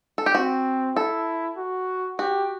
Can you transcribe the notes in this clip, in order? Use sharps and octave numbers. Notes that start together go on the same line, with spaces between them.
A4
G4
C4 F#4
E4 A4
F#4
F#4 G4